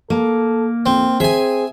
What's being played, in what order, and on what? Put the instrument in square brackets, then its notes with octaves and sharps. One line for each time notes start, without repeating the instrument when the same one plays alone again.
[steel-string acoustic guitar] A#3 [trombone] A4
[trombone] F2 [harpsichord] C4
[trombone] C4 [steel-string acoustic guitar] G#4 [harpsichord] E5 G#5